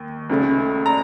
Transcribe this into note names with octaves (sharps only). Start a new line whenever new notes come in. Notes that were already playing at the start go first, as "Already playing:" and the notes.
Already playing: D#2
C#2 C#3 A3
A#5